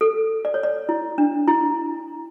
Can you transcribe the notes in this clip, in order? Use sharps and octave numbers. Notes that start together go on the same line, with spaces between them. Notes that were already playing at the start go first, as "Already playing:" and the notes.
A4
D5
C#5
D5
E4
D4
E4